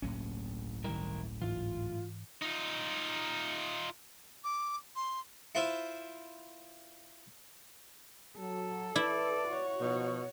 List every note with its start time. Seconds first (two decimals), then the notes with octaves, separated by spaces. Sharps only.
0.02 G1 C#2 A2 F#3 A#3 C#4
0.84 D#3 G3 E4 A#4
1.42 G#2 E3 F4
2.42 D#4 F4
4.44 D6
4.96 C6
5.55 E4 F4 B4 C5 E5 F5
8.38 F#3 A4
8.96 E4 B4 D5
9.48 F#4 C#5
9.80 B2 F3 B3 D#4